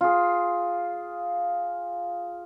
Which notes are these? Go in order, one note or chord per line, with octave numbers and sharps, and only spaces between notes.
F4 G#4